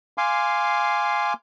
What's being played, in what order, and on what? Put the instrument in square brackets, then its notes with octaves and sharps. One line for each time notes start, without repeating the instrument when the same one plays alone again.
[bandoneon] F5 G#5 C6 D6